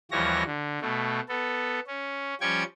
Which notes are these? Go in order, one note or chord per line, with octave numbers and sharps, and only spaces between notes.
D#2 E3 F3 G3 C#5 A#6
D3
B2 A3
B3 A4
C#4
F3 G3 C#4 G5 C#6 G#6